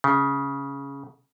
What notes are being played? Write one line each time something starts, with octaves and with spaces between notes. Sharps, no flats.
C#3